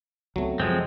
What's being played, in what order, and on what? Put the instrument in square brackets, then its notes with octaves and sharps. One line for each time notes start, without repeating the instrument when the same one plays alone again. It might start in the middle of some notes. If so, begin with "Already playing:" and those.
[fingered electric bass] C#2 B3 C4 [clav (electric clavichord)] F#3 A3
[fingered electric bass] F#2 C#3 [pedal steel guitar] F3 G#3 C4